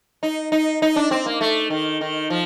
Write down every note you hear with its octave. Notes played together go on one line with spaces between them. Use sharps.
D#4
D#4
D#4
D4
C4
A#3
A3
D#3
D#3
F3